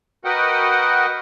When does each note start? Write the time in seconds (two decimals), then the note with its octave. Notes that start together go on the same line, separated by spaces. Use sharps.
0.25 F#4 A#4 B4 D#5 F#5 G5